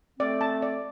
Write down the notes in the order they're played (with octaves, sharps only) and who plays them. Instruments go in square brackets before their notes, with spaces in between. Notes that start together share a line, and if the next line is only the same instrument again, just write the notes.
[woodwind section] A3 C4 [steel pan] D5
[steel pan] A5
D5